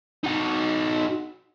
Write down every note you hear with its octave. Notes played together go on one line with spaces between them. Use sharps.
D#4 F#4